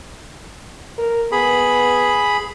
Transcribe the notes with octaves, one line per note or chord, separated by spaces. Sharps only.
A#4
B3 G#4 B5